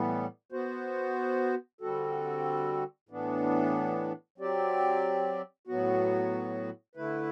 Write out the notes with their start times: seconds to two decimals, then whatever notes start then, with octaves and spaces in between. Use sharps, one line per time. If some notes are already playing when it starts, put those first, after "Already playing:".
Already playing: A2 E3 G3 B3
0.52 B3 F#4 C5
1.81 D3 G3 C4 F#4 A4
3.09 A2 E3 B3 D4
4.38 F#3 C4 G4 D5
5.67 A2 F#3 B3 F#4
6.95 D3 A3 E4 B4